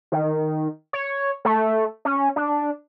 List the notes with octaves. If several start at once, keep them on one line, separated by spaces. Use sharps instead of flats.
D#3
C#5
A3
C#4
D4